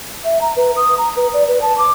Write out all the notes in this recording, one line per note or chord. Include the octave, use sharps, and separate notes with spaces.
E5
A#5
B4
D#6
A#5
B4
D5
B4
A5
D6